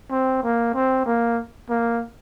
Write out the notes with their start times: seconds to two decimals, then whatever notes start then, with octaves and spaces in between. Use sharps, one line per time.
0.11 C4
0.43 A#3
0.74 C4
1.06 A#3
1.69 A#3